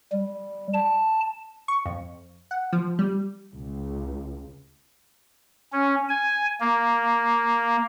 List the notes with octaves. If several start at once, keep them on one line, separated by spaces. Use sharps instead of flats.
G3
A5
C#6
F2
F#5
F3
G3
C#2
C#4
G#5
A#3